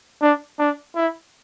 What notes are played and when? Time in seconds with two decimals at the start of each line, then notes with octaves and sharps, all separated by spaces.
0.22 D4
0.59 D4
0.96 E4